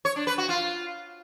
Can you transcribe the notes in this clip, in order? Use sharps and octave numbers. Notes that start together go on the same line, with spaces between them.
C#5
D4
B4
F#4
F4